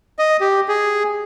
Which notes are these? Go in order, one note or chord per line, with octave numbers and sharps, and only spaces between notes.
D#5
G4
G#4